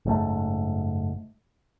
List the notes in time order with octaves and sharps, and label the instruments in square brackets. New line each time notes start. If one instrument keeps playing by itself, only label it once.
[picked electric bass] F#1 G#2 A3